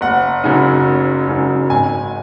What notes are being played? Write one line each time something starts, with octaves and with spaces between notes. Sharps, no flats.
F#1 F#5
F#2 C#3 G#3 D#4
F#1
F#2 C#3 G#3 D#4
G#1 G#5